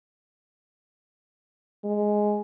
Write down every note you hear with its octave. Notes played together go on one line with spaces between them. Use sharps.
G#3